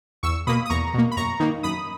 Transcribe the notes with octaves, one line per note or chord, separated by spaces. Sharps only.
E2 C#6 E6
B2 A#3 B5 D#6
D#6
E2 A#5 C#6
B2 A#3
B5
F#2 A#5 C#6
D#3 A#3
F#2 B5 D#6